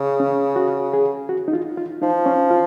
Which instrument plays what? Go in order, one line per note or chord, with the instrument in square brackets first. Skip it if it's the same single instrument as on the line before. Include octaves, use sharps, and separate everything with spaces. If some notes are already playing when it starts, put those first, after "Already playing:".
Already playing: [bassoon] C#3
[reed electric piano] C#4
F#4
G#4
F#4
D#4
F4
F4
[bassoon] F3 [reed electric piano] D#4
[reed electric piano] C#4
F4